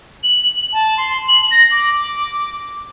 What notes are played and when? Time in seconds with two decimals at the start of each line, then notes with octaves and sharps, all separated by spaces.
0.23 F#7
0.73 A5
0.97 C6
1.28 F#7
1.51 A#6
1.71 D6